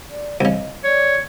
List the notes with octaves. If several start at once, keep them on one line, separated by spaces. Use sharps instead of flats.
D5
C2 C#3 D#5
C#5 D5